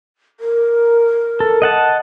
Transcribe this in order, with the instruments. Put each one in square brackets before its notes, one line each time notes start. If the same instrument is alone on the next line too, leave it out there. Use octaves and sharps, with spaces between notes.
[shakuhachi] A#4
[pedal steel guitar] A4
D#5 F#5 A5